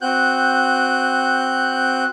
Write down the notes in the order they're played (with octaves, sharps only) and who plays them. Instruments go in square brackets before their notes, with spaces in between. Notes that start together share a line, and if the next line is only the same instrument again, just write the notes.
[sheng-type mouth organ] C4 F#4 F#6 G6